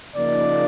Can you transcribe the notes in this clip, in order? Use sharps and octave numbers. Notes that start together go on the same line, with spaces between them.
C#3 F3 A#3 D#4 D5